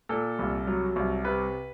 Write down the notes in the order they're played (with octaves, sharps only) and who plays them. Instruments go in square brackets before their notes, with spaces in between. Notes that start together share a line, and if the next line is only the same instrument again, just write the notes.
[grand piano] A#2 A4
C2
F#3
C2
C3 B4